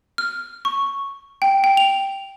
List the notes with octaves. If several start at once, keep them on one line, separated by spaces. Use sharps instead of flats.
F6
C#6
G5
G5
F7